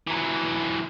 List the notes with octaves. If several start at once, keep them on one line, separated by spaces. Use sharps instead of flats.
E3 F#3